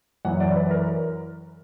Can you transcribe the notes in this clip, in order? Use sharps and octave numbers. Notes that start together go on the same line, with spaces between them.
F#2 E3 F#5
D5
B4
A#4